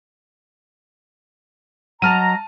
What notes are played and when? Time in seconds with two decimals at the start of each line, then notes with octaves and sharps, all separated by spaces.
2.02 F#3 D#5 A5 A#5 F6 D#7